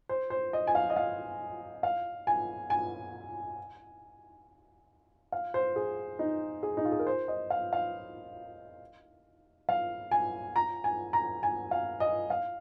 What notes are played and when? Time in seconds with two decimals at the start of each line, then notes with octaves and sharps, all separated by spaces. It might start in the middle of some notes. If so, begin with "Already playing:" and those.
0.09 C5
0.30 C5
0.53 D#5
0.67 G#5
0.75 F5
0.90 D#5
0.96 F5
1.83 F5
2.27 G#5
2.70 G#5
5.32 F5
5.54 C5
5.76 G#4
6.19 D#4
6.63 G#4
6.77 D#4
6.85 F4
6.92 G#4
6.99 A#4
7.07 C5
7.28 D#5
7.50 F5
7.73 F5
9.69 F5
10.11 G#5
10.56 A#5
10.84 G#5
11.13 A#5
11.43 G#5
11.71 F5
12.00 D#5
12.30 F5